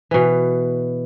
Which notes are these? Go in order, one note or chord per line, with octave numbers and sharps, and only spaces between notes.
B2 E3